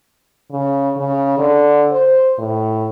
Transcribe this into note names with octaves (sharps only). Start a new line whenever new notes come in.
C#3
C#3
D3
C5
A2